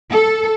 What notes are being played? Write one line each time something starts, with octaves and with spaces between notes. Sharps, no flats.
A4